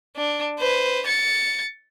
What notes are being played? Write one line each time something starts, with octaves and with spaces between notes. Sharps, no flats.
D4
B4 C5
A6 C#7